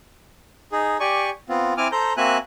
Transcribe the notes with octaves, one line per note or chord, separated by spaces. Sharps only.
D#4 G#4
G4 D5 G#5 C#6
B3 C4 F4
C4 E4 G#5 D6 F6
A4 C5 A#5 G6
A#3 C4 F#4 E5 G#5 F#6